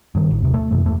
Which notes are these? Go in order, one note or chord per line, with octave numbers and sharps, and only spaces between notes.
G2 D#3
A1
D#2 C3
A3
D#1 F#2 C3 E3
E2 G2 A3